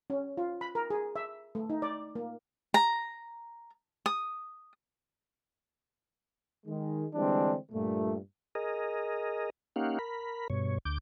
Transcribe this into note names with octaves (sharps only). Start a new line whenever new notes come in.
C#4
F4
B5
A#4
G#4
E5
A3
D#4
D5
A#3
A#5
D#6
D#3 G#3
D3 E3 G3 G#3 C4 D4
G2 A#2 A3
G#4 A#4 D#5
A#3 C#4 D#4 G4 F5 F#5
A#4 B5
G2 B2 C#5
D2 D6 G6